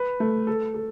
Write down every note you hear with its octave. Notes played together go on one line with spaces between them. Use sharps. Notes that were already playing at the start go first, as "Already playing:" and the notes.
Already playing: B4
A3
A4
A4